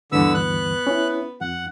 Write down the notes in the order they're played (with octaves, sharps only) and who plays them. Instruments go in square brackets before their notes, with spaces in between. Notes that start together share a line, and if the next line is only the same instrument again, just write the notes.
[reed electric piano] D2 G2 E3 [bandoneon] D3 E6 [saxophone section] B3
[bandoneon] F#6
[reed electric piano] C#4 E4
[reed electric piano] F2 [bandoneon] F#5